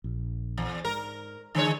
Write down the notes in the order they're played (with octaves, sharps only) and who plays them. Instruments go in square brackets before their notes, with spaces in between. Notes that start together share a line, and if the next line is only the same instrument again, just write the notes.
[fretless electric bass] A#1
[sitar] E2
[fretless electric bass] G#2 [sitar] A#4
[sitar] D3 G#3 C#5 [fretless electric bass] E3